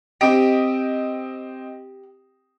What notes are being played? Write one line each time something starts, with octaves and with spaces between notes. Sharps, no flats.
C4 G4 D#5